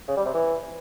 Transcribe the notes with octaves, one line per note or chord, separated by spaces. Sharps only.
C#3
G3
C3
E3